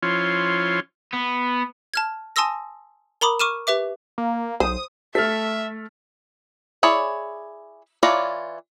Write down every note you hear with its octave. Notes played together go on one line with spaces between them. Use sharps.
F3 C#4 E4 F4 C#5 C6
B3
A5 F6 G#6
G#5 A5 C6 D#6 E6 A#6
A#4 A#5 B5 D6 D#6
C#6 D6 F6 D#7 E7
G4 B4 E5 D6
A#3
B1 C5 D#6
A3 A4 E5 F6 B6
E4 G#4 C#5 D5
E3 F4 C#5 D5 A#5